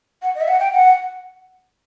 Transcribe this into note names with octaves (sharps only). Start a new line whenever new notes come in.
F#5
D#5
E5
F#5
G5
F#5